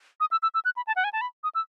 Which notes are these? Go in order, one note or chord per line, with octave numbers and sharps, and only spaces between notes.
D#6
E6
E6
E6
F#6
B5
A5
F#5
G#5
A5
B5
D#6
E6